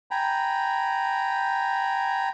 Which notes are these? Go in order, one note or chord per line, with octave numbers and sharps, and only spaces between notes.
G5 G#5 A#5 B5